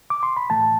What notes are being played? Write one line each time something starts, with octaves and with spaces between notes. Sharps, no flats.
D6
C6
B5
A2 E3 A3 A5